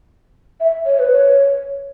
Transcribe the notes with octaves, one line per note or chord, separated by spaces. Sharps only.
E5
C#5
B4
C#5